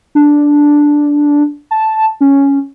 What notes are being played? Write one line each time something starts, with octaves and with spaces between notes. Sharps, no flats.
D4
A5
C#4